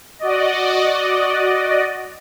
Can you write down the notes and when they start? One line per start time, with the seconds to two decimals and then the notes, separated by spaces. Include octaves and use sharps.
0.19 F#4 D5 D#5